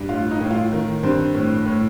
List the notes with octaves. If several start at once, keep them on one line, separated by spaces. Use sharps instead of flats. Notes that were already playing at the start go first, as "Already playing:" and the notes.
Already playing: G2
A2 F4
D#4
A2
F4
D#3
G2 C4
A2
A2